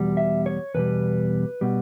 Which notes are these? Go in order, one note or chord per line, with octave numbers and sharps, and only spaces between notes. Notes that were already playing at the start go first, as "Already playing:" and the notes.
Already playing: E2 B2 G3
E5
C#5
E2 B2 G3 B4
B2 G3